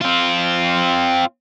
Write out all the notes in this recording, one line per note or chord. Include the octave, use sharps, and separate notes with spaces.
C4 F4